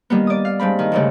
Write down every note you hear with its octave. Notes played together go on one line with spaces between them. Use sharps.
D#3 G3 A#3 B3
D5 D#6
F5
G2 G#3 C4 B5
D#3
D2 G2 C#3